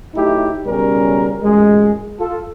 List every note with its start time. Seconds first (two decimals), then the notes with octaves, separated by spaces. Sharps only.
0.15 F#3 A3 D#4 E4 G4
0.66 B1 C#3 G3 C#4 A#4
1.43 A1 F#2 G#3
2.20 F4 A4